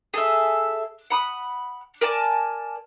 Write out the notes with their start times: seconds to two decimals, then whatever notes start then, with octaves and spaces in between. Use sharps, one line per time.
0.14 G#4 A4 E5
1.10 F#5 B5 D#6
2.01 A#4 D5 G#5 A5